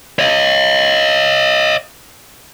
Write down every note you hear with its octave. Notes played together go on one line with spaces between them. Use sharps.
C#5 D#5